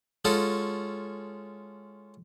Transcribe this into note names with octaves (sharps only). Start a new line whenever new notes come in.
G#3 C#4 F4 F#4 A4